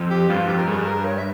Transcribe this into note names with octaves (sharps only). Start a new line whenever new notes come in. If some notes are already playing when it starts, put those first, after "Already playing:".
Already playing: F2
G4
G2 F4
F2 G4
A#4
G2 G#4
A#4
C#5
E5